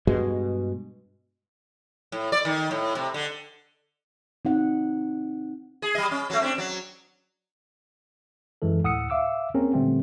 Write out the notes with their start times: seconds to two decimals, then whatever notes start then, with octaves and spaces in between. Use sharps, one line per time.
0.07 G2 B2 G#3
2.12 A2
2.32 D5
2.45 D#3
2.71 A2
2.95 C3
3.14 D3
4.45 C4 D#4 F#5
5.82 G#4
5.95 G3 D#5
6.11 C#4
6.30 F#3 A3
6.42 C4 D4
6.58 F#3
8.62 F#2 E3 G#3 A4
8.83 D2 A2 F#5 D#6 E6 C#7
9.10 E5 F5 D6 E6
9.54 A#3 C4 C#4 G#4 A#4
9.73 A#2 D3 G3 A3 B3 C4